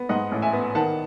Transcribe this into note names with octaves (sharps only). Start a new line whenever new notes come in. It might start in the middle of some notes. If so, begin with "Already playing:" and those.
Already playing: B3
G#2 D#5 F#5
A1
E5 G#5
B3
D#3 F#5 A5